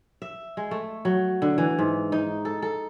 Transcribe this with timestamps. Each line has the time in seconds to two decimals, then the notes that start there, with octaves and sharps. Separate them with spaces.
0.22 E5
0.57 G#3
0.71 A3
1.05 F#3
1.42 D3
1.58 E3
1.79 G#2
2.12 D#4
2.45 A4
2.62 A4